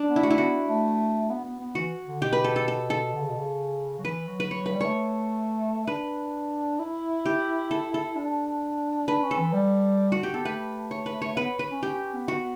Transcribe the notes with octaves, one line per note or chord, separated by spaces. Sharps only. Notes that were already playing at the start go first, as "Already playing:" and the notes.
Already playing: D4
B3
E4
A3 F#4
E4
B3 F#4
A3
B3
B3
B3
E3 F#4
D3
B2 G4
B4
A4
A4
A4
A4
D3
C#3
B2
C#3
F#3
E3 B4
F#3
B4
F#3 C#5
F#3 B4
G3
A3 C#5
D4 B4
E4
G4
A4
A4
D4
D4 B4
C#4
A4
E3
G3
F#4
G4
B3 A4
A3 B4
C#5
B4
C#5
B3 B4
B4
C#4
C#4 G4
C#4
B3
B3 F#4